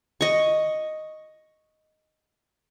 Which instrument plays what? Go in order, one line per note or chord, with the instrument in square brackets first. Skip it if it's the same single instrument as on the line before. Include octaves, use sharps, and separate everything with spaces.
[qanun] D#5 C#6